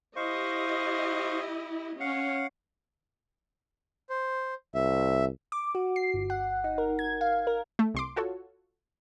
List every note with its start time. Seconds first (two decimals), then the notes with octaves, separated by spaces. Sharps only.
0.16 E4 G4 C5 D#5 F5 C#6
2.00 C#4 F5 F#5
4.10 C5
4.74 C2 E5
5.52 D6
5.75 F#4
5.96 C7
6.14 G1
6.30 F#5
6.64 D#4
6.78 A#4
6.99 G#6
7.21 F5
7.47 A#4
7.79 A3
7.94 C2 C6 D6
8.16 F4 F#4 A4 C#5